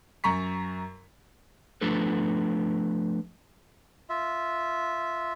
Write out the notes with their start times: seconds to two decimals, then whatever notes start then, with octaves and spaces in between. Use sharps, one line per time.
0.24 F#2 A#5 C#6 B6
1.81 F3 A3 D4 A4 B4
4.09 F4 E5